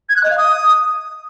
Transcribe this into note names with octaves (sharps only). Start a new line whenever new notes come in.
G#6
F#6
D#5
F5
D#6